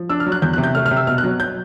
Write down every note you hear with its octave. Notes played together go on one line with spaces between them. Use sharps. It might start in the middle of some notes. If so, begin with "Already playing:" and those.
Already playing: F3
D4 E6
F6
F#3
F#6
E2 G6
C3 F#6
G6
A3 F6
F6
C3
E6
B2 F6
F#6
F#3
G6